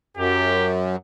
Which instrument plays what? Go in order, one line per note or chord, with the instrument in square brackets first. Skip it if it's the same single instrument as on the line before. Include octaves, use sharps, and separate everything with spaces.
[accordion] F#2 [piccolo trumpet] G4